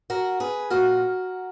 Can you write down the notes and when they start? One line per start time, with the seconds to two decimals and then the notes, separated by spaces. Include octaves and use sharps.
0.10 F#4 A#4
0.40 G#4 B4
0.70 A#2 F3 F#4 A#4